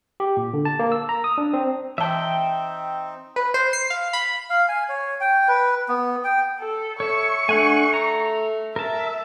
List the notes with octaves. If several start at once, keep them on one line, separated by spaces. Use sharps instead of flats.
G4
A#2
D3
A5
A#3
E6
A#5
D#6
D4
C4
E3 C4 D#4 E5 G5 A5
B4
C5
C7
F5
B5
F5
G#5
C#5
G5
B4
B3
G5
A4
A4 C#5 E5 C#6
A3 D4 F#5 G#5
A#5
A#4 E5 A5